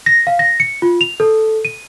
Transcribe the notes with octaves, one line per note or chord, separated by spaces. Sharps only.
A#6
F5
A#6
C#7
F4
F7
A4
D#7